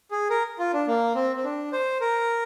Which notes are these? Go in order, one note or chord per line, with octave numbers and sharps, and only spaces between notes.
G#4
A#4
F4
D4
A#3
C4
C4
D4
C5
A#4